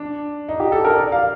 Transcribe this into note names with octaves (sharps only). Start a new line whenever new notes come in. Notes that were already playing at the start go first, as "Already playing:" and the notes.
Already playing: D4
D#4
G4
A4
A#4
D5
F5